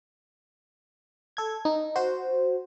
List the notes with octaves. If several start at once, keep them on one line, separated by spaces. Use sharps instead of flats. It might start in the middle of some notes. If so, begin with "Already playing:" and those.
A4 G#6
D#4
F#4 C5